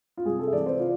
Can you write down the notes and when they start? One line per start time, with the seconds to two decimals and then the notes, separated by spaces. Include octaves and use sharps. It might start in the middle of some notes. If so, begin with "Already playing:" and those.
0.17 F4
0.25 C2 G#4
0.39 A4
0.47 E5
0.53 C3 E3 D5
0.66 C5
0.79 F4